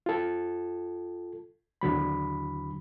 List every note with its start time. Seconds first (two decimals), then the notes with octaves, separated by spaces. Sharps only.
0.06 F4 A4
1.81 D#2 D3 F#3 B5